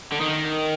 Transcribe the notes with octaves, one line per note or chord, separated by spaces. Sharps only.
D3
D#3